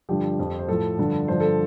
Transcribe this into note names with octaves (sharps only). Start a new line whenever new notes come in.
G2 D3 F3 G4
F2 F3
C5
A2 F3 A4
G2 D3 F3
G2 D3 F3 C5
A4